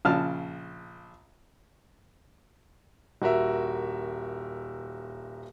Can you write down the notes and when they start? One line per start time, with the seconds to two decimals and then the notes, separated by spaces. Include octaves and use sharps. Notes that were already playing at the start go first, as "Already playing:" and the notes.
0.05 A#1 C#3 A5 F6
3.22 D#1 F#4 A#4 E5